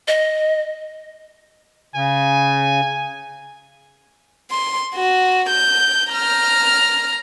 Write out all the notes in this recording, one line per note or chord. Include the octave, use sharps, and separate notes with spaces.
D#5
C#3 G#5
C6
F#4
G6
A#5 F6